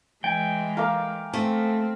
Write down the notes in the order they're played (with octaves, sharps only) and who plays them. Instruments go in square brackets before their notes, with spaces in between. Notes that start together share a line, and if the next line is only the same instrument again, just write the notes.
[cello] E3 G#3 [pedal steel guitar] G5 G#5
[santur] A#4 F5 D6
[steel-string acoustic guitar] A3 [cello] C4